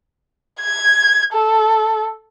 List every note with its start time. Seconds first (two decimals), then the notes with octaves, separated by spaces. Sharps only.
0.61 G#6
1.33 A4